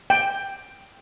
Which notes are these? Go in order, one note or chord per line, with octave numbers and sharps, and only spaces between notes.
G5